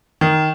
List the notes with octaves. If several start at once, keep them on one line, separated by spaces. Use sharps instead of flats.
D#3